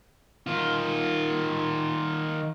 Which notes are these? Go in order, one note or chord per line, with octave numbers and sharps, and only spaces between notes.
D#3 F4